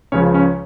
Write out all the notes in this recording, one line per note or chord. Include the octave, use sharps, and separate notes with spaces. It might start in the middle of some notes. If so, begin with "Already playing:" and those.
C#2 C#3 F3 C#4 C#5
C#4 C#5